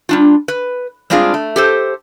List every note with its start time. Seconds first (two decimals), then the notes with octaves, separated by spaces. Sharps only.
0.09 G3 D4 F4
0.48 B4
1.10 G3 G#3 C4 D4 F4 G#4
1.34 A3
1.56 G4 A4 C5